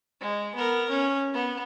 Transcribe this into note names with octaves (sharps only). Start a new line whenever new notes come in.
G#3
B3 A#4
C#4
B3